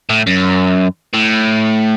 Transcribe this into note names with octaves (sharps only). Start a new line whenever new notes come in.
A2
F#2
A2